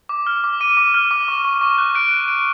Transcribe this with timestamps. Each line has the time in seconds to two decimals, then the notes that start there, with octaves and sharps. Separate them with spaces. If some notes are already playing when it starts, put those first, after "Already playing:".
0.09 D6
0.27 F6
0.44 D6
0.60 D6 D#7
0.77 D6
0.94 F6
1.11 D6
1.28 C#6
1.45 C#6
1.61 C#6
1.78 F#6
1.95 F#6 D7
2.11 F#6
2.28 F#6 D7